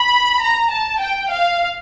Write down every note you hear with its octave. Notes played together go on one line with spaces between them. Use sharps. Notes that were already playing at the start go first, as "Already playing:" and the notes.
Already playing: B5
A#5
A5
G5
F5